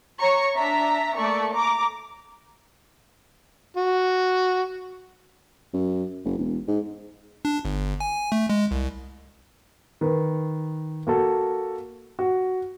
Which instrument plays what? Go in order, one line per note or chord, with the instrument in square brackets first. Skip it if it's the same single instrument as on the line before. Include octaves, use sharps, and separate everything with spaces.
[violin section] C#5 A#5 C#6
D4 E5 A#5 B6
A3 A#3 D5 C#6
A#5 D6
[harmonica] F#4
[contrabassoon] F#2
F#1
E1
G#2
[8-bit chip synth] D4
G1
G#5
A3
G#3
C2
[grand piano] D#3 B4
A#3 F#4 A4
F#4